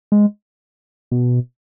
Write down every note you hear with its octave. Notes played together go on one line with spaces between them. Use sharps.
G#3
B2